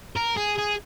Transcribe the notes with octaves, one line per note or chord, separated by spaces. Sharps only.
A#4
G#4
G#4